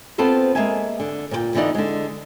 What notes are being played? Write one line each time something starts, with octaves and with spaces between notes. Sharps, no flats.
B3 C4 F4 A4 B4 C5
G#3 A#3 B3 E5 G#5
D3
A#2 C5 G5
D3 E3 B3 D#4 D5 F#5
D3 G#3